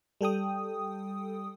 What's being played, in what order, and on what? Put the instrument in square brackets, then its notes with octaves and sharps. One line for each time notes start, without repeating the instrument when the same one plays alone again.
[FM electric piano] G3 A4 G5 D#6